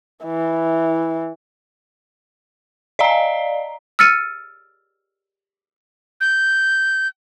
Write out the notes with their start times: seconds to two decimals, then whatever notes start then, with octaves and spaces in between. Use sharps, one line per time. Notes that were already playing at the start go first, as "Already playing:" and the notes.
0.25 E3
2.99 D5 D#5 F5 A#5
3.99 E6 F6 A6 C#7 D#7
6.21 G6